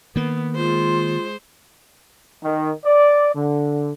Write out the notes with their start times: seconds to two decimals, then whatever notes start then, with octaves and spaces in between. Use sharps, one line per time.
0.16 D#3 A#3 B3
0.56 G#3 F4 C5
2.43 D#3
2.85 D5
3.36 D3